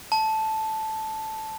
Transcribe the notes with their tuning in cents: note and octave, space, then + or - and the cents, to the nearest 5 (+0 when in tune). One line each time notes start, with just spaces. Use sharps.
A5 -5